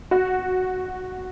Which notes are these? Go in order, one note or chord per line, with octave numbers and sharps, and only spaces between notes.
F#4